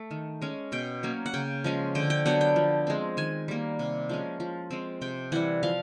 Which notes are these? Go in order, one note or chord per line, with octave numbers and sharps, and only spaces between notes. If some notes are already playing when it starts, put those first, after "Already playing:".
Already playing: A3
D#3
G#3 C#4
B2 G5
F#3 A#3 C#4
F#5
C#3 G5
F3 G#3 C#4
D3 G5
G5
F#3 B3 D4 F#5
G5
F3
G#3 C4
D#3 G#5
G3 A#3
C3
F3 G#3 C#4
F3
G#3 C4
C3 G5
E3 G3 F#5
F3 F5